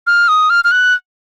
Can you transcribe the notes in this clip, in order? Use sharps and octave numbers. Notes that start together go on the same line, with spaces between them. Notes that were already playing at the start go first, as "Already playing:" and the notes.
F6
D#6
F6
F6
F#6